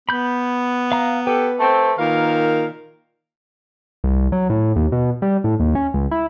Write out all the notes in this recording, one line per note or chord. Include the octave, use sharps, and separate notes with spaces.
B3 B5 G6
F5 A#5
G4 A4 B4
A3 C4
A#2 D#3 A#4 F5
C2
F#3
A2
D#2
B2
G3
A2
D#2
C#4
C#2
E4